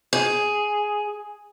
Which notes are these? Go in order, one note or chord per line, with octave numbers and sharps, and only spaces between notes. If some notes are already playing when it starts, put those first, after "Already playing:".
G#4